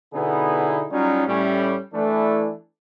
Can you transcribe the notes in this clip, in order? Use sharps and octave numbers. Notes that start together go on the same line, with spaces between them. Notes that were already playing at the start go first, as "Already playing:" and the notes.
B2 D3 B3 D#4 E4 G#4
F#3 G3 C#4 D#4 F4
A2 G3 C#4
E3 A3 D4